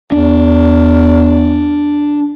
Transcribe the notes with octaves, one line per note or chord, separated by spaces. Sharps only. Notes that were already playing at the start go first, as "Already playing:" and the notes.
E2 D4